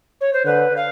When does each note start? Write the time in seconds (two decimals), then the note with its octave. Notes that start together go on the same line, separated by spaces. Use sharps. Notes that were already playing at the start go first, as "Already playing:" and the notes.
0.20 C#5
0.33 C5
0.45 D3 B4
0.76 F5